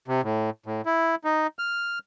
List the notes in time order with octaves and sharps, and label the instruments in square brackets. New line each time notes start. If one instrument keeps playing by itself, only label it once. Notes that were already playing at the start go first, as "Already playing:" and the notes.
[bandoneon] C3
A2
A2
E4
D#4
F6